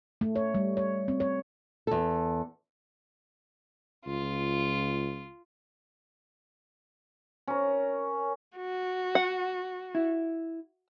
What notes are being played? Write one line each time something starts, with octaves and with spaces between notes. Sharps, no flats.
A3
C#5
G3
C#5
C4
C#5
E2 A4
C#2 F4
C#4 A#4
F#4
F#5
E4